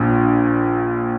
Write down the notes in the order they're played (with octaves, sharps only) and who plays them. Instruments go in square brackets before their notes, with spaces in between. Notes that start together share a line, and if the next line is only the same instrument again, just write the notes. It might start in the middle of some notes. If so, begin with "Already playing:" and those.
Already playing: [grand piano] A#1 A#2